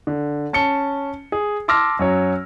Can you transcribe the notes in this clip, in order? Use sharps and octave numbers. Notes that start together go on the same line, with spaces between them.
D3
C#4 A5 C#7 G7
G#4
A5 C6 D6 E6 F6 A#6
F#2 F#3 C#5